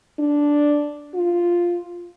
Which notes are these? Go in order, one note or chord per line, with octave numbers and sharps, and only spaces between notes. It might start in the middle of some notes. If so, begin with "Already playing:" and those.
D4
F4